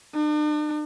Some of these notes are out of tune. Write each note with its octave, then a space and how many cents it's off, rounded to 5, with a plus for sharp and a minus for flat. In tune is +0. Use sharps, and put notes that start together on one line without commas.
D4 +45